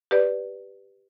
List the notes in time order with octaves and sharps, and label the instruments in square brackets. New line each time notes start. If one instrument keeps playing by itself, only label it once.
[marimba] G4 B4 D5